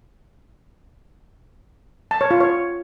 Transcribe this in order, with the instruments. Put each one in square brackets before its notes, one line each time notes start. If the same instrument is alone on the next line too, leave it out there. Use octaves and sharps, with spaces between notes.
[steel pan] A5
C#5
F4
C#5